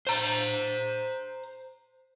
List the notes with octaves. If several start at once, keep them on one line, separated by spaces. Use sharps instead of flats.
C5 A#5